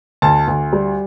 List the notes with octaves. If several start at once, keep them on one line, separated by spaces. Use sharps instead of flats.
D2 A5
D2
G3